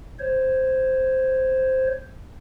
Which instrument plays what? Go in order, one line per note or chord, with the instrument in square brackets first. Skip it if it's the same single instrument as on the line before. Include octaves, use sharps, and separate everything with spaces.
[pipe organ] C5 C#5